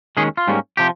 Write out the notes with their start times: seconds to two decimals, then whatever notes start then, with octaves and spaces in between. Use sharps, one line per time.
0.17 D#2 D#3 G#3 C#4 G#4
0.37 F4
0.47 G#2 G3 A#3 C#4
0.77 C3 F3 G4